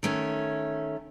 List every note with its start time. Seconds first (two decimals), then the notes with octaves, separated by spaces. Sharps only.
0.03 D#3 A3 C#4